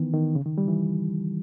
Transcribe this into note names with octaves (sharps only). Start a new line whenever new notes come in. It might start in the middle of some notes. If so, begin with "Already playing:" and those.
Already playing: D#3 E3 B3
D#3
C#3
D#3
G3
E3